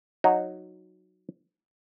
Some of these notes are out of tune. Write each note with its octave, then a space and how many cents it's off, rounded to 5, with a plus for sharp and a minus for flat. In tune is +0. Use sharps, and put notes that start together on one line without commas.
F#3 -10 D#4 -5